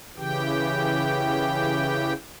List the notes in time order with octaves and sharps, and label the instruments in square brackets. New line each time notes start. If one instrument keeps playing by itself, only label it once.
[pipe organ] C#3 E3 G4 G5